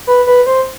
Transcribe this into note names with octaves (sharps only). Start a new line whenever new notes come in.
B4
B4
C5